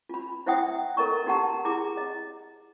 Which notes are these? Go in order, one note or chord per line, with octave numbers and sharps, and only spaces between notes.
F4 B5
E4 C5 E5 F#5 G5 D#6
A4 A#4 D#5 A#5 C#6
D#4 F#4 G4 F#5 A5 A#5
E4 G#4 A#5 D6
D#5